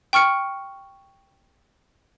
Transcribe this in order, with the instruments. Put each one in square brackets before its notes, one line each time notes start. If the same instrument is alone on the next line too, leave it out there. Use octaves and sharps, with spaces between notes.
[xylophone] G5 C#6 F6 C#7